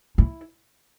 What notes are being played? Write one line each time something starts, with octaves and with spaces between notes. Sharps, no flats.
E4